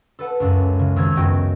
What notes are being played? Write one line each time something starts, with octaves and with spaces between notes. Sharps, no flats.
A4 B4 F#5 A5
C#2 F#2
C#3
G#1 E6 G#6
F#2 B3 F#4 D#5 G5 G6